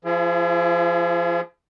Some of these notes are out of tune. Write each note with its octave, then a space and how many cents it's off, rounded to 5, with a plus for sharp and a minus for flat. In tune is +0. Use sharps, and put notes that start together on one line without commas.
F3 -20 E4 +45 G#4 +0